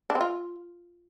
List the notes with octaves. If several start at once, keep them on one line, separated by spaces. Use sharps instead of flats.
D4
C4
F4